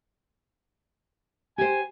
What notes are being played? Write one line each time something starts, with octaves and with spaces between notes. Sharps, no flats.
G4 C5 G#5